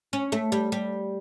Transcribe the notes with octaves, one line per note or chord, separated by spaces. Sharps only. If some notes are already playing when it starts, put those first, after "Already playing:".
C#4
A3
G3
G3